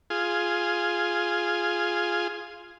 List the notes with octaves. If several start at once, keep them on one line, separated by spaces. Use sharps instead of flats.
F4 G#4